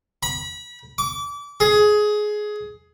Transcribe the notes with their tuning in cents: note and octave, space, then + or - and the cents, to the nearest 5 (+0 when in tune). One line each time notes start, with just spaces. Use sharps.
B5 -30
D6 -30
G#4 +15